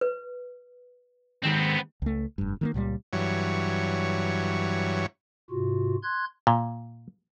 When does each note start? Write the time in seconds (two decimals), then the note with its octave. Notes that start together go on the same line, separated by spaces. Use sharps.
0.01 B4
1.43 D#2 G#2 D#3 B3 C4
2.02 C#2 A3
2.38 F1 G2
2.61 D#3 A3 A#3
2.74 C#2 A#2 F3 G3
3.13 G2 E3 F#3 C#5
5.50 G#2 C3 F4 F#4
6.03 C6 F#6 G#6
6.47 A#2